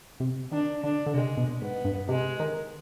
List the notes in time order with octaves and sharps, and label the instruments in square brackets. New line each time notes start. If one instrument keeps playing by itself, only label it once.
[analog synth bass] C3
[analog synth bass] D#3 [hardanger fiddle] D4
[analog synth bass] D3 [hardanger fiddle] D4
[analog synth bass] D3
[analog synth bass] C3 [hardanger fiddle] G#3
[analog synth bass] B2
[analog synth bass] G#2 [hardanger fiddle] B3
[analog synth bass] G2
[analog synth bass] C3 [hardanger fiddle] G#3
[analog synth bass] D#3